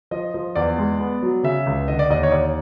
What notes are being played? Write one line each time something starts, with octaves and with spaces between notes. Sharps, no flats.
F3 D#5
F3
E2 D5
G#3
B3
F#3
C#3 E5
C#2
D3 D#5
D5
D#2 D#5
C#5
D#2 D5